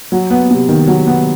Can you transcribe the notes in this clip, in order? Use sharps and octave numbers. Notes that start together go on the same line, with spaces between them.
F#3
B3
C3
D#3
F#3
B3